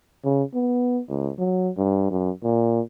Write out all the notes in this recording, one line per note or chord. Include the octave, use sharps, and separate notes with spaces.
C#3
B3
C#2
F#3
G2
F#2
A#2